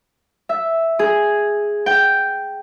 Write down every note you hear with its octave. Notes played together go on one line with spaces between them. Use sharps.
E5
G#4
G5